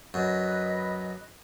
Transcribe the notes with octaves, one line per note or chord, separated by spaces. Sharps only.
F#2 B4 D#5